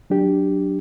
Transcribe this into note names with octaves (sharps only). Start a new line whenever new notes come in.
F#3 D4 G4